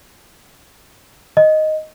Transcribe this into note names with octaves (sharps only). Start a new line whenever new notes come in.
D#5